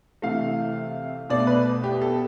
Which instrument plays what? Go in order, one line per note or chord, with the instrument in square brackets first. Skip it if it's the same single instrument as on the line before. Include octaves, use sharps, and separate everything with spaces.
[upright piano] C3 E3 A3 F5
B2 A3 D5
B4
G4
A4